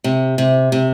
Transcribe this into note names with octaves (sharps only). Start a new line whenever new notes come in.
C3
C3
C3